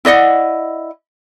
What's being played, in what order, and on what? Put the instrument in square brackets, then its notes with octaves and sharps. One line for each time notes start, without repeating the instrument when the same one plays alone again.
[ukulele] E4 D5 D#5 F#5